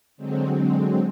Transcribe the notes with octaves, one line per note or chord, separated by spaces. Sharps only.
D3 F#3 G#3 C4